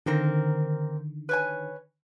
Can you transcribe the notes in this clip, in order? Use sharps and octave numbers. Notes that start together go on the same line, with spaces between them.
D3 D#3 A#3 C4 A#4
B4 C#5 G#5